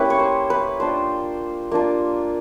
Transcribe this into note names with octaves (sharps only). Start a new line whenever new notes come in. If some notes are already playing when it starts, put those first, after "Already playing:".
Already playing: A#3 C#4 E4 G4 B4
C#5
C5
B4
A#3 D4 F4 C5
A#3 D4 F4